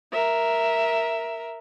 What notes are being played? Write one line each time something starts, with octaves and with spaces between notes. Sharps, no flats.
A#4 E5